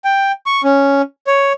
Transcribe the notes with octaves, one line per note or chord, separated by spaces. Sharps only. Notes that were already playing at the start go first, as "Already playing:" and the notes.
G5
C#6
C#4
C#5